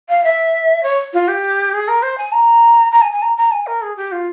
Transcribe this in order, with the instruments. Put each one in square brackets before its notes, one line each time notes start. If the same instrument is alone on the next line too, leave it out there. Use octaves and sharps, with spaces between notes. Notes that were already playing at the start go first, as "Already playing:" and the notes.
[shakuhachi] F5
E5
C#5
F4
G4
G#4
A#4
C5
G#5
A#5
A#5
G#5
G#5
A#5
A#5
G#5
A#4
G#4
G4
F4